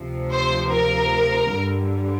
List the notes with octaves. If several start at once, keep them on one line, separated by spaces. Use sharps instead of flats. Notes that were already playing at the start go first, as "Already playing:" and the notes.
Already playing: D2 C3 F3
C5
A#4
G2 D3 G3